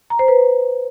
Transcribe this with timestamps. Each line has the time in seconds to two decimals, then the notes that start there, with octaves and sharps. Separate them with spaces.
0.10 A#5
0.19 C5
0.28 B4